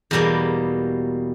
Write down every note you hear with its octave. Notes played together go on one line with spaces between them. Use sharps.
E2 B2 G3 A#3